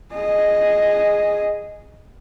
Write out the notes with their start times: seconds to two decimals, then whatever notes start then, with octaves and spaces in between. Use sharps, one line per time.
0.14 G#4 D#5